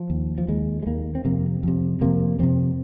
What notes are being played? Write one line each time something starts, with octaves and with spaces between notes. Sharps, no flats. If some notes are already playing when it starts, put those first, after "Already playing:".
Already playing: F3
D#2
F3
D#2 G#3
G#3
D#2 A#3
C4
F2 C3 A#3
F2 C3
F2 C3 A#3
F2 C3 C4